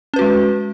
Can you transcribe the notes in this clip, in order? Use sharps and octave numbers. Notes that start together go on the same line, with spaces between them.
G#3 C#4 F#4 B4